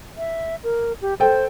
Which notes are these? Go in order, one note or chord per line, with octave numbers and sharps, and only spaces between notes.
E5
A#4
G4
A4 C5 G5